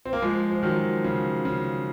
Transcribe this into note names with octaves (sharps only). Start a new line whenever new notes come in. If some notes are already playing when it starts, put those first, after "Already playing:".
C4
A#3
F3 G#3
F3
D#3 F#3
C#3
C#3